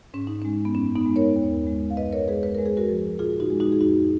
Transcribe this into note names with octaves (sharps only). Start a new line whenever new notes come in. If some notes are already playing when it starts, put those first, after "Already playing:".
G#2 C#4
D#4
G#3 C#4
B3
F#2 C#4
B3 D#4
G#3
A#4 C#5
D#2
G#3
F5
F#2 B4 D#5
A#4 C#5
G#3 G#4 B4
B4
G#3 A#4
G#4
F#4 A#4
F3
A#2 F4 G#4
D#4 F#4
G#3
D#4 F#4
G#4
F#2 D#4 F#4